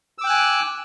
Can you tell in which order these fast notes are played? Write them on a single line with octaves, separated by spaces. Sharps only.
E6 D6 G5 F#6 G#5